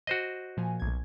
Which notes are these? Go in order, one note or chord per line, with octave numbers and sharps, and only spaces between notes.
F#4 C5 D#5
A#2 F3 G#5
B1 G#6